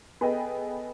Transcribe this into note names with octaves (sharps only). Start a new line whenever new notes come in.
B3 G#4 A4 B4 D#5 G5